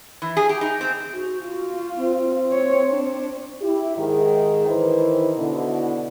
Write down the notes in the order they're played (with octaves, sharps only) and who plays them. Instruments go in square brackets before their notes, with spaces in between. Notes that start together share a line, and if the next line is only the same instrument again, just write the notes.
[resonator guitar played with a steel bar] E3
G#4
G4
D#4
C4
[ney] F#4
[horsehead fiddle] F4 [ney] F#4
[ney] C4
[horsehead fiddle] C#5
D4
[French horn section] E4 G4
G#2 D#3 G#4
D#3 E3 D#4 E4 B4 C5
B2 D3 E4